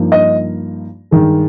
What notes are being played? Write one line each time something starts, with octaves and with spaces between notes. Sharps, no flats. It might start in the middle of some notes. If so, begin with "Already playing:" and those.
Already playing: G2 F3 A#3 D#4
D#5
G2 D#3 G#3